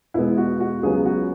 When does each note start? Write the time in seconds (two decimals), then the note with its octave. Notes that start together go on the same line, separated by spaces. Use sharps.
0.14 E2 B2 G#3 B3 E4
0.37 F#4
0.60 F#4
0.83 C#2 C#3 F#3 B3 G#4
1.05 F#4